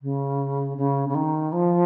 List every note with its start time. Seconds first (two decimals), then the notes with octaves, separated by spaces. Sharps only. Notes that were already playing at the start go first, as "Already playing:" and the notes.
0.02 C#3
0.77 C#3
1.08 C#3
1.14 D#3
1.52 F3